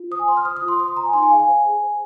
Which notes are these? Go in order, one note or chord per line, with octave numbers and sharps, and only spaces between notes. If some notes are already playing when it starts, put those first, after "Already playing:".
Already playing: F4
C5 D#6
G#5
C5 C6
F6
C5 D#6
D#6
F4
C6
C5 D#6
C6
C5 A#5
G#5
D#4 C6
G#5
G#4 F5
G#5
C5
G#4
C5